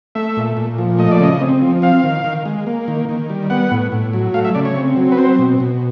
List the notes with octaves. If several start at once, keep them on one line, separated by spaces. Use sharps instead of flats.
A3 E5
A#2
A#2
F3
A3 D#5
D5
C#3 D#5
C4
F3
C4 F5
D#3
D#3
G#3
A#3
D#3
D#3
G3
B3 F#5
A2
A2
F#3
A3 F5
E5
C#3 D5
C#5
C4
F#3
B4
C4 C5
B2
B2